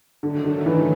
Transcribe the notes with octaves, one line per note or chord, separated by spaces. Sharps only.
D3 D#3 F#3 A3
D3
E3